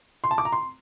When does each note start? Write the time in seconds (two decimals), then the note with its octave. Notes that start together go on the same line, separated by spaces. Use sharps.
0.24 C6
0.31 A5
0.38 D6
0.45 A#5
0.52 C6